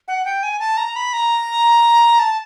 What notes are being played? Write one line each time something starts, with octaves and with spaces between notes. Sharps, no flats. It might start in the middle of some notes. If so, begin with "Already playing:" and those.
F#5
G5
G#5
A5
A#5
B5
A#5
A5